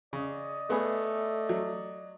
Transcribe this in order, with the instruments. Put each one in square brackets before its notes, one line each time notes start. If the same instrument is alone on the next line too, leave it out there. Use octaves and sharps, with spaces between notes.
[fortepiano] C#3 [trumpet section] D5 D#5
[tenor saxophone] A3 [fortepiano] B3 G#4
[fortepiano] F#3